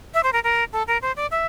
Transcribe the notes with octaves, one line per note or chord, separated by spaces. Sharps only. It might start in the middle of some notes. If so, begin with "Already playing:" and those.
E5
C5
A#4
A#4
A4
A#4
C5
D5
E5